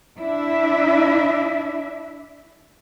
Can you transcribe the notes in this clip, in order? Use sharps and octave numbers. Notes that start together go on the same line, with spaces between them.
D4 E4 E5